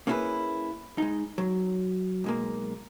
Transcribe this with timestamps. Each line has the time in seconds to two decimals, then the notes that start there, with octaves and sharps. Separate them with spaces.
0.07 A#3 C#4 D#4 E4 G#4 B4
0.98 G#3 D#4
1.38 F#3
2.24 B1 G#3 A#3